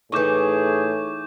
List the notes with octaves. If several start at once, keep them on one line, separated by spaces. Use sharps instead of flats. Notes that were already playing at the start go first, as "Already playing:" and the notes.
A2 E3 D#4 G#4 C#6 D6 G6